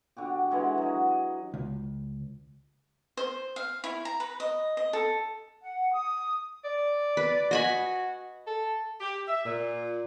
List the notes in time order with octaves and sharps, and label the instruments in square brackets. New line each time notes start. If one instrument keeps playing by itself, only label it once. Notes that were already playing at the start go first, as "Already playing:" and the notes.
[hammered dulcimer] D3 F#4 G4
D3 E3 G#3 F#4
F#3 D#5
D#5
[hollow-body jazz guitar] C#2
[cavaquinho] C5
F5
E4
A#5
B4
D#5
D#5
A4
[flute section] F#5
D#6
[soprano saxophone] D5
[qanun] B4
[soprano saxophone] F#4 [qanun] D#5 G#5 B5
[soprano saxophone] A4
[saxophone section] G4
E5
A#2